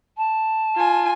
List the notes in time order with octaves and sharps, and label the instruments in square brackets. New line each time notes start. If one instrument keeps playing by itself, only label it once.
[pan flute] A5
[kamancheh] F4 G#5